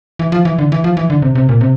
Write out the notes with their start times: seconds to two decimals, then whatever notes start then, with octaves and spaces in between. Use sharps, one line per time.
0.19 E3
0.32 F3
0.45 E3
0.59 D3
0.72 E3
0.84 F3
0.97 E3
1.10 D3
1.22 C3
1.35 C3
1.49 A#2
1.61 C3